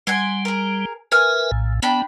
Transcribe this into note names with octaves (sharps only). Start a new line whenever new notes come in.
G3 F#5 G#5 C6
G#4 A#4
A#4 B4 E5 G#5 F6
A#1 A2
B3 D4 G5 B5